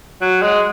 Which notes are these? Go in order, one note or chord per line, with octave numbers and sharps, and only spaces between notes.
F#3
G#3